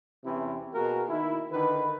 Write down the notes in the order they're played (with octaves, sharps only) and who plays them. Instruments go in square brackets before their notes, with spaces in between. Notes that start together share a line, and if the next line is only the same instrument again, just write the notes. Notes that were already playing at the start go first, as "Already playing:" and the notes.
[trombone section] E2 C3 E3 C4 C#4 E4
B2 A#3 F#4 G#4 A#4
D#3 E4
D3 D#3 B4